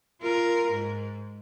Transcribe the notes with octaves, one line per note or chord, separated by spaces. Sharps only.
F4 A#4
G#2